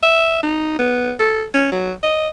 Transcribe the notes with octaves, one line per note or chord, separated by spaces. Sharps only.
E5
D#4
B3
A4
C#4
F#3
D#5